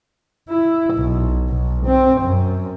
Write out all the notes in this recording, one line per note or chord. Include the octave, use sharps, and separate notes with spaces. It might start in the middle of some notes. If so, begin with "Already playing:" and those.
E4
B1
B1
C4
F#2